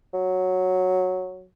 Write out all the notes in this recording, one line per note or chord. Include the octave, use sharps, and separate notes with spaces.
F#3